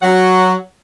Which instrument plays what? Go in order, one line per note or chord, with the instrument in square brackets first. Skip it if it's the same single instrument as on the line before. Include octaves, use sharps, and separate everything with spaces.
[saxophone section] F#3 F#5